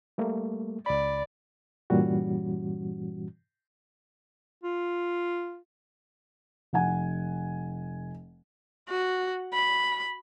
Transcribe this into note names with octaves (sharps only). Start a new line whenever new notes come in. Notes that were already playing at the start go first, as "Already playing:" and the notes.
G3 A3 A#3
C#2 D5 B5
G2 A#2 E3 G3 C#4 F#4
F4
F1 F#5 G#5
F#4
B5